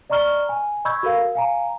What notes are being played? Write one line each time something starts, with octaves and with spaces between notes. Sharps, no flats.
D5 D#5 A#5 C#6 F6 G7
G#5
D#5 B5 C#6 E6 G6 G#6
F#4 A4 A#4 F5
F5 G#5 A#5